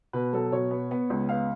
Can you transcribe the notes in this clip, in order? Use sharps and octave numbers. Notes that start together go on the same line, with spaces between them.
B2 B4
F#3 A4
B2 C#5
B3
B3
C#2
B3 F5